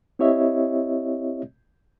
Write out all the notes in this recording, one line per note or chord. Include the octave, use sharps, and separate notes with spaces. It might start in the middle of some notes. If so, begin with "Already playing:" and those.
C4 E4 G4 C#5 D#5 E5